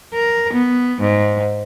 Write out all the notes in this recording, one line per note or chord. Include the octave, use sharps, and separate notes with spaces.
A#4
B3
G#2